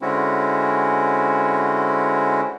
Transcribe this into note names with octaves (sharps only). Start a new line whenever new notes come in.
D3 G#3 C4 C#4 E4 F#4